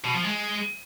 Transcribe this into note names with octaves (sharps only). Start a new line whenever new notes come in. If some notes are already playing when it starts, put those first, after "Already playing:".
B2
F3
G#3